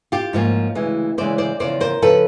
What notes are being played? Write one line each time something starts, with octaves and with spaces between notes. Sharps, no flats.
F4 G4
G#2 F3 A#3 C#4
D2 C#3 E3 G#3
D2 C#3 E3 G#3 C5 D5
C5 D5
E2 C#3 F3 C5 D5
A#4 C5
C#3 F3 A4 B4